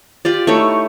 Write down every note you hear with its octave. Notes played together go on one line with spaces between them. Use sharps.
F4 G4 D5
A3 D#4 E4 C#5